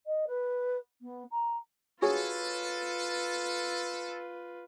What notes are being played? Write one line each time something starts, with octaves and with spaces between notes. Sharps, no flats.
D#5
B4
B3
A#5
F4 F#4 G#4 A4 B4 C#5